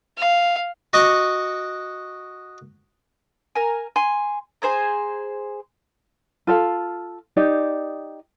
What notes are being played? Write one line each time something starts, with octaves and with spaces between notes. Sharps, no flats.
F5
F#4 D#5 C#6 D6
A#4 G#5
G#5 C6
G#4 C5 G#5 A#5
F4 A4 F5
D#4 G4 D5